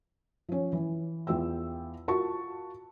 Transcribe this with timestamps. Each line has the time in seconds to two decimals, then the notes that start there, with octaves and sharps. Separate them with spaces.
0.49 F3 C#4
0.73 E3
1.27 E2 F4 G5 E6
2.08 F4 F#4 A#4 A5 C#6